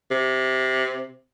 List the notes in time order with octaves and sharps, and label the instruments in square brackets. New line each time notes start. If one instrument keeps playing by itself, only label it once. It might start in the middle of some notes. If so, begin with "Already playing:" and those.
[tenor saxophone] C3